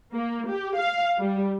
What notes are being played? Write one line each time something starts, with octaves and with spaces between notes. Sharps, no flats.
A#3
G4
F5
G3